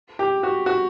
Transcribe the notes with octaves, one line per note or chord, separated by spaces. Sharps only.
G4
F#4
F#4